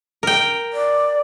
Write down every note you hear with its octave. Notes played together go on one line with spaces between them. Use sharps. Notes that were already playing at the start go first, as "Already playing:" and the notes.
A#4 G5
D5